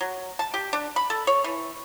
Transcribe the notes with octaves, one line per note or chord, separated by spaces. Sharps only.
F#3
A5
G4
D4
B5
A4
C#5
E3